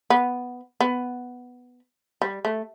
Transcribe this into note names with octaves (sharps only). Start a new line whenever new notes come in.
B3
B3
G3
A3